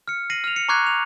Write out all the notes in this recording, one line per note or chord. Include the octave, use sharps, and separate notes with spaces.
F6 C#7
A#6 C7 D#7 F#7
F6 F7
C#7 F7
A#5 C#6 D6 F#6 G#6 C7
F7